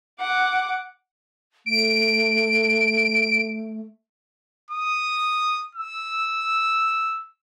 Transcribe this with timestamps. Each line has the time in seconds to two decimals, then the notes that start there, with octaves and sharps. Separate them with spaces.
0.20 F#5 D6
1.66 A3 D7
4.70 D#6
5.75 E6